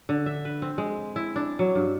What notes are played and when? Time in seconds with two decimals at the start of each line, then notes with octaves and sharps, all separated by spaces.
0.09 D3
0.26 E5
0.45 B4
0.62 C4
0.78 G#3
1.16 E4
1.36 D4
1.59 F#3
1.75 G2